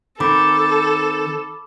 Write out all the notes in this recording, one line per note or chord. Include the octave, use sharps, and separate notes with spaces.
D#3 C4 A4 B5 D6